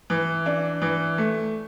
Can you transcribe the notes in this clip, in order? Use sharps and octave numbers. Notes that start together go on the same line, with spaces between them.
E3
D4
E3
A3